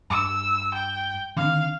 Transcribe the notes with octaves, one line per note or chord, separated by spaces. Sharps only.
G2 E6
G5
D3 D#3 C4 F5